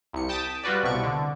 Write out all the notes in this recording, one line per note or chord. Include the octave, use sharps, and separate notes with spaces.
C2 C#7
G5 A5 D#6 A6 B6 D7
G3 F4 F#4 B4 D5
C2 B2 C#6 D7
D3